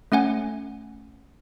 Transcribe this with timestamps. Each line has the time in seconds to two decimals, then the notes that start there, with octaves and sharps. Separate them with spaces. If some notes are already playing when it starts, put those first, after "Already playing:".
0.12 A3 C#4 F#5 G#5